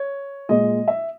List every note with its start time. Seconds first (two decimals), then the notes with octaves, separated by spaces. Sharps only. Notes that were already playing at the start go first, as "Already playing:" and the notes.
Already playing: C#5
0.49 A#2 G#3 D#5
0.88 E5